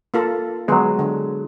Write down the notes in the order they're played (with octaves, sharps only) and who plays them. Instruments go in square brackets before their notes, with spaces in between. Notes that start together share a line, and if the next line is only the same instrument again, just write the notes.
[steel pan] A#3 F4 A4
[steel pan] D3 B3 [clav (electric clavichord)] F#3 G#3
[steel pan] D3